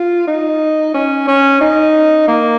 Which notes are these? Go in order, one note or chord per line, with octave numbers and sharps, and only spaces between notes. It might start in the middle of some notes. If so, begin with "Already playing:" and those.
Already playing: F4
D#4
C#4
C#4
D#4
A#3